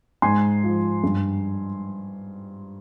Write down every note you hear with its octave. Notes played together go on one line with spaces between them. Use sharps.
G#2 G#5 C6
F3
G2